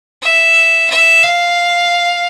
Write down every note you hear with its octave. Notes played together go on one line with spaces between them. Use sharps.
E5
E5
F5